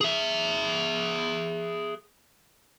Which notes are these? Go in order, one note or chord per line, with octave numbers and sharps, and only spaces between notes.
G#4 E5